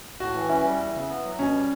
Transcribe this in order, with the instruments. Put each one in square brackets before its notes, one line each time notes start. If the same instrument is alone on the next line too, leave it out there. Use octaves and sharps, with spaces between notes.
[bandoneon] A2 [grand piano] F#4
[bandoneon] E3
[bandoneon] C#4 [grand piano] E4
[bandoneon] G3
E2
C#3
B3
F#3
[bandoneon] B2 [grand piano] C#4
[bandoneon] G3